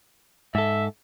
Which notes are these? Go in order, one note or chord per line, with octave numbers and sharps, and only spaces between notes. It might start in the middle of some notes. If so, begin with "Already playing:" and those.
G#2 A4 E5